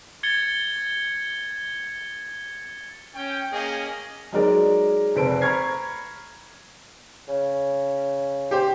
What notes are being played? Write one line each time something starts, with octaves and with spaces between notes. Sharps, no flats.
G#6 A6 C#7 G7
C#4 G5
A#3 C#4 G#4 D#5
F#3 G#3 D#4 A#4 D5 D#5
F1 A4 B4 C5 D7
A#5 B5 C#6 F6 G#6 C7
C#3
G4 C5